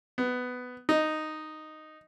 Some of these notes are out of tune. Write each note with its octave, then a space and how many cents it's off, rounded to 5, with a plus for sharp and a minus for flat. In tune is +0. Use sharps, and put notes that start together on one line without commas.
B3 +10
D#4 -5